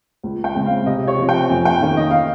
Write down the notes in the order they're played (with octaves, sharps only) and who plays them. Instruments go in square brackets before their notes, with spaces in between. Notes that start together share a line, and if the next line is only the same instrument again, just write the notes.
[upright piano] C#2
G5
C#3 G#3 C4
F5
C3 D#5
C#5
F3 C4
G5
F2 G#5
G5
D#3 A#3 C#4
D#5
F5